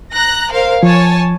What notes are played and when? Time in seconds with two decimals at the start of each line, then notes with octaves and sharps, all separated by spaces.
0.12 A#5 F#6 A#6
0.51 A#4 C5 F5
0.83 F3 C#5 G#5 A5